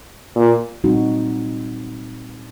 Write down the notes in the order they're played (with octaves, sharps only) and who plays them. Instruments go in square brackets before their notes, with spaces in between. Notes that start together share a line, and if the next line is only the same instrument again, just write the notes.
[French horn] A#2
[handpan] A#2 G3 C4 D#4 F#4